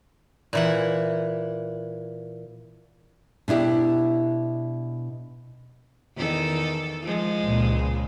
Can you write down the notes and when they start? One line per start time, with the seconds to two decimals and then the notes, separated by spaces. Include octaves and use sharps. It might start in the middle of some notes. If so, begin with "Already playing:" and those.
0.53 A#2 E3 F#5
3.48 B2 D4 E4 G4
6.15 E2 D#3 A4
7.02 F3 G#3
7.43 C#2 A#2